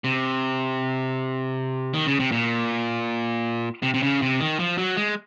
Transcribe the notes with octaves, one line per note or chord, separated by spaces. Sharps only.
C3
D#3
C#3
C3
A#2
C3
C3
C#3
C3
D#3
F3
F#3
G#3